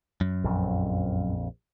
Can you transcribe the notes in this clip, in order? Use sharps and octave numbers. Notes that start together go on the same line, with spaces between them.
F#2
A#1 F2